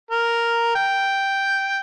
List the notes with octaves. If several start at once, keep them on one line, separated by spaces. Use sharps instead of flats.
A#4
G5